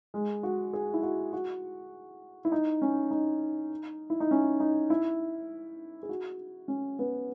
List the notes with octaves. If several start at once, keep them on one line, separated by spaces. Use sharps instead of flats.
G#3
F#4
G#4
E4
F#4
F#4
E4
D#4
C#4
D#4
E4
D#4
C#4
D#4
E4
G#4
F#4
C#4
B3